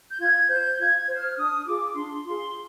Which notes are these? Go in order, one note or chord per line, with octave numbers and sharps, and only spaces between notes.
G6
F4 G#6
C5 G6
F4 G#6
G#6
C5
F6
D4 D#6
F4 G#4 D6
D4 C6
F4 G#4 C6